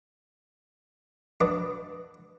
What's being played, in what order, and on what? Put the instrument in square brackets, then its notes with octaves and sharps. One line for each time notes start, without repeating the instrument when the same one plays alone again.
[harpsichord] F#3 D4 B4 D5 D#5 D6